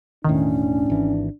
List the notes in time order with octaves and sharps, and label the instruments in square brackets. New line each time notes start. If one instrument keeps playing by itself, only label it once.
[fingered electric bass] E1 A2 [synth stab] D#3 [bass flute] C#4 [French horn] D4
[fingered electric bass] G#1 E3